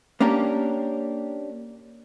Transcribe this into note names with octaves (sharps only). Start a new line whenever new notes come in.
A#3 C#4 D4 G4 A#4